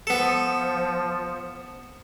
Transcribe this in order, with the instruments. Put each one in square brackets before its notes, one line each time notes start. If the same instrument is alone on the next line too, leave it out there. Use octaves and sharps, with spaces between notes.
[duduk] F3 [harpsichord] B3 A4